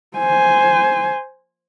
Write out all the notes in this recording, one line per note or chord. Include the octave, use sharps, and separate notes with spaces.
C5 G#5